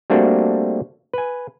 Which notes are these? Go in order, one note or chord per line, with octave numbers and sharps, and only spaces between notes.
G3 A3 A#3 C4 D4 F#4
B4 G#5